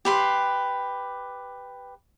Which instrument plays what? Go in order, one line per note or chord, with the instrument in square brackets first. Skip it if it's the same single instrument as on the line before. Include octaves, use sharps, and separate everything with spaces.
[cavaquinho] G4 B4 C6